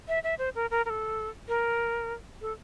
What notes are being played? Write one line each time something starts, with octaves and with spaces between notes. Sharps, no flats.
E5
E5
C5
A#4
A#4
A#4
A4
A#4
A4